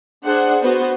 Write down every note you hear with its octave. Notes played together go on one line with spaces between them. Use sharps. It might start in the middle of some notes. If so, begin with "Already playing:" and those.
D4 G#4 C5 F#5
B3 F#4 B4 C5